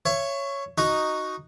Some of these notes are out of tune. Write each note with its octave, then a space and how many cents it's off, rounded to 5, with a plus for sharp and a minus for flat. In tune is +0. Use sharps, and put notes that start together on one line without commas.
C#5 +0 E5 +35
D#4 +0 F#4 +0